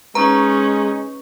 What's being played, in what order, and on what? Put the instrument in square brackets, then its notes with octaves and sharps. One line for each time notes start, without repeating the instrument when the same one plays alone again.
[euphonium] G#3 [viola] C#4 D#4 [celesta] B4 C#6 [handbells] A#5